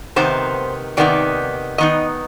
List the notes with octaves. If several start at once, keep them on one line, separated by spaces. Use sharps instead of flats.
C3 D#3 B3 D#4 C5
C3 D#3 B3 D#4 D5
D#3 B3 D#4 D#5